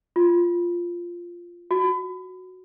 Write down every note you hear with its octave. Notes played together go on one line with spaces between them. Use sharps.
F4
F#4